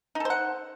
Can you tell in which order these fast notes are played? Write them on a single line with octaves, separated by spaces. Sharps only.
D#4 A4 C5 F#5